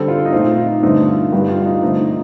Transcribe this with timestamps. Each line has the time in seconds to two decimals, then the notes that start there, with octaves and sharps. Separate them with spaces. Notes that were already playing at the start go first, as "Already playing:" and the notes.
Already playing: D3 G3 C4 A4
0.08 F4
0.25 D#4
0.32 A#2 A3 C4 F4
0.58 D#4
0.83 G2 D3 A3 C4 D#4
1.08 F4
1.32 G2 D3 G3 A#3 G4
1.49 F4
1.62 F4
1.65 D#4
1.82 D3 F3 A3 C4 D#4
2.05 D#4